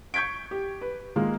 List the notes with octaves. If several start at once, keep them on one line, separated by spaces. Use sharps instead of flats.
C#6 G6 G#6 B6 D7
G4
B4
D#3 G#3 A#3 F4